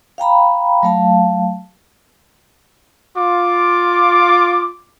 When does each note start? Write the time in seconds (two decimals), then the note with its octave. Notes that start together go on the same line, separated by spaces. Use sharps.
0.18 F5 G5 A#5 B5
0.83 F#3 A3 F5 A5
3.18 F4 D6